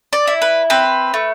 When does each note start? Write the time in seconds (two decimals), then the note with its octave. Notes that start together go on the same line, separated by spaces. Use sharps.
0.13 D5
0.27 E4
0.42 B4
0.70 C4 B4
1.14 A3